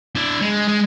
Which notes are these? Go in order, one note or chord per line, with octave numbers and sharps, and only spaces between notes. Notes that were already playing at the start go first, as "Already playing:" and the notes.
D4 E4
G#3
G#3